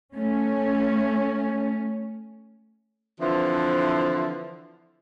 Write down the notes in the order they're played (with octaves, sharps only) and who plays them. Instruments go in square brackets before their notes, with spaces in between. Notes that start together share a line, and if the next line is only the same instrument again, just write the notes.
[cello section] A3 C#4
[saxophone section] D3 E3 F3 C4 E4